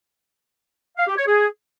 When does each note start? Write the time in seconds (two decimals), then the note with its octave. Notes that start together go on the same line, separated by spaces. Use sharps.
0.97 F5
1.07 G4
1.17 C#5
1.27 G#4